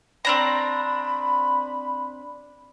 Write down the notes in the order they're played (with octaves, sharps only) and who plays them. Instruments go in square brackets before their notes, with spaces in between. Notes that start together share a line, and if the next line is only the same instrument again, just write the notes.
[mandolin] C4 D4 A#5 [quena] B5